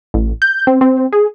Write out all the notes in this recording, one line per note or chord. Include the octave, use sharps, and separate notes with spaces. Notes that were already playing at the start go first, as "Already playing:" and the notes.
A1
G6
C4
C4
G#4